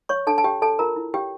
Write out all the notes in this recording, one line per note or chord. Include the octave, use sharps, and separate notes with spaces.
C#5 C#6
D4 A4 A5
A5
G4 C#5 G5
A4 C#5 A5
F4 A#4 A#5
E4
G4 C#5 G5